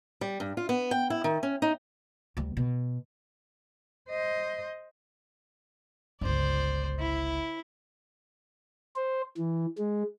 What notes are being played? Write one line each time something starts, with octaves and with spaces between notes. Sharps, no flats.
G3
G2
F4
B3
G5
E4
D#3
C#4
D#4
D2 G3
B2
C5 D#5
G1 C#2 C5 D5
E4
C5
E3
G#3